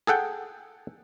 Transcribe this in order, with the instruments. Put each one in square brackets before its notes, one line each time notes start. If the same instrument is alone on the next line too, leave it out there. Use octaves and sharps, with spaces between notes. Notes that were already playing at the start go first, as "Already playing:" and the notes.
[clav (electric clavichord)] G#4 A4 F#5 G5